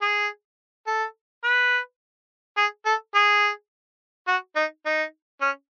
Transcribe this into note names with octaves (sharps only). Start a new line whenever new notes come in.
G#4
A4
B4
G#4
A4
G#4
F#4
D#4
D#4
C#4